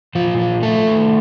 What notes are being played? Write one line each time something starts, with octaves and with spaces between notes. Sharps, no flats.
A#2 F3 F4
F3
D#3 A3 A4
D#3